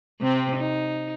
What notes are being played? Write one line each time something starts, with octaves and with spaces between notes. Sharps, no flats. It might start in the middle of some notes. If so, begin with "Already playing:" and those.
C3 C4
D#4